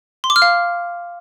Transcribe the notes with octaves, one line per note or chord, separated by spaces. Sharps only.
C6
D6
F6
F5